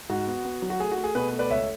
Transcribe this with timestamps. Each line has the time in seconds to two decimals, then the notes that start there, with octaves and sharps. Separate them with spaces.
0.10 G#2 F#4
0.27 B3
0.45 B3
0.62 F#3
0.70 F#4
0.79 A3 G#4
0.92 F#4
0.98 A3
1.04 G#4
1.15 B2 G#4 B4
1.33 A3
1.39 B4 D5
1.50 C#2 C#5 E5